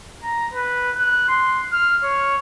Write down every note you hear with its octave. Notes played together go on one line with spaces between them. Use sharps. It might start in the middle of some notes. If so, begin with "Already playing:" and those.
A#5
B4
F#6
C6
F6
C#5